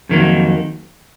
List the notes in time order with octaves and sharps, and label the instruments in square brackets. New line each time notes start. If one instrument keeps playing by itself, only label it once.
[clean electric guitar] F2 D#3 F#3 A#3